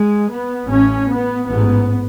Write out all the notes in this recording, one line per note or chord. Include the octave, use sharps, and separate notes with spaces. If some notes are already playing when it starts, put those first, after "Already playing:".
Already playing: G#3
B3
A1 A2 C#4
B3
A1 G#2 B3